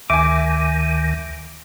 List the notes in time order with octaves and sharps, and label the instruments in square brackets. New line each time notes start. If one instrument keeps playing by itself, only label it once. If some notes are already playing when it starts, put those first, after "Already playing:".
[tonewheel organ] D2 D#3 [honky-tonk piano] E5 G#5 [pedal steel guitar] D6